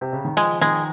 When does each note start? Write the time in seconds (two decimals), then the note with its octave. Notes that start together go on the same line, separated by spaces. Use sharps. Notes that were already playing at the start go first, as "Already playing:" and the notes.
0.01 C3
0.13 C#3
0.25 D#3
0.36 F3 G#3
0.61 D#3 G#3